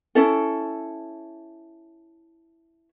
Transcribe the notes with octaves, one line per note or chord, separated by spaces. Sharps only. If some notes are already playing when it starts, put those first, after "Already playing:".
C#4 E4 A4